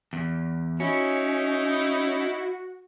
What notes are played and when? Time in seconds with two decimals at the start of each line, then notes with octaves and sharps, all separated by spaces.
0.13 E2
0.80 C#4 D#4 E4 F#4